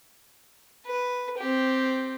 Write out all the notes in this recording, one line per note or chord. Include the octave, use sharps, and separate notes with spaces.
B4
C4 G4